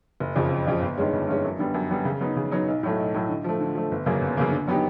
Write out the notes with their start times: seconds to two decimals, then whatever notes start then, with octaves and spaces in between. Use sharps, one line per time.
0.20 F#1
0.36 F2 C#3 F3
0.51 F#1
0.67 F2 C#3 F3
0.82 G1
0.98 G2 D#3 G#3 C#4
1.13 G1
1.28 G2 D#3 G#3 C#4
1.45 F#2
1.59 D3 G3 B3
1.74 F#2
1.91 D3 G3 B3
2.05 C#3
2.20 F#3 B3 D#4
2.36 C#3
2.51 F#3 B3 D#4
2.68 B1
2.83 A2 F#3 A3
2.99 B1
3.14 A2 F#3 A3
3.29 D3
3.44 F3 A3
3.60 D3
3.75 F3 A3
3.91 G1
4.06 F#2 C#3 F#3 A#3
4.22 G1
4.37 F#2 C#3 F#3 A#3
4.52 D3
4.67 F#3 B3 D#4 G4